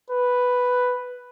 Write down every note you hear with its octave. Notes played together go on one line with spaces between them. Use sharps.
B4